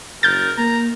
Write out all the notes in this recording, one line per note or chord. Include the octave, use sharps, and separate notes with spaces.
F#1 A#4 G6 A6
A#3 A#5